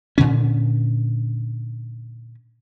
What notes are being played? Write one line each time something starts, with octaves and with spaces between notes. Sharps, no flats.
A#2 D3 C#4